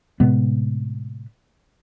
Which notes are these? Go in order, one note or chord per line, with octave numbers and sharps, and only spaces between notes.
A2 C3 G#3 B3